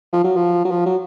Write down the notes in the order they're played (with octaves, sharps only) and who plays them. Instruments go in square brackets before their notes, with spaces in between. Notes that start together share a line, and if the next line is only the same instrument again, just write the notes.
[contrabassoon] F3
F#3
F3
F#3
F3
F#3